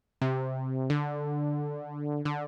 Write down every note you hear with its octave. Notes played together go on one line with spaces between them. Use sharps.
C3
D3
D3